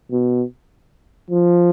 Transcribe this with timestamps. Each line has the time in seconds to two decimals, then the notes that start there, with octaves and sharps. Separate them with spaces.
0.12 B2
1.30 F3